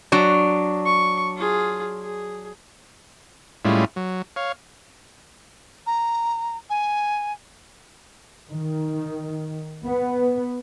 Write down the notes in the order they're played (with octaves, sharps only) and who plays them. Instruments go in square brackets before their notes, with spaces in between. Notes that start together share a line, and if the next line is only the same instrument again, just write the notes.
[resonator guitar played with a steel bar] F#3 D4
[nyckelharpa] C#6
F4 G#4
G#4
[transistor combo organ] A2 G3 G#3 C#4 E4 F4
F#3
C#5 F5
[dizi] A#5
G#5
[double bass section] D#3
B3